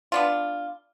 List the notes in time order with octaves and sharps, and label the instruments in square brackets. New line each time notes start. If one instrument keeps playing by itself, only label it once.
[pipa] B3 D4 F4